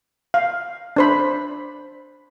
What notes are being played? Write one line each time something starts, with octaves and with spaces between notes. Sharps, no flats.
F5
D4 C5 B5